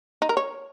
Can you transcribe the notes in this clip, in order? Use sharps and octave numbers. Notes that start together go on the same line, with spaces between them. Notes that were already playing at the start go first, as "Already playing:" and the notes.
D#4
A#4
C#5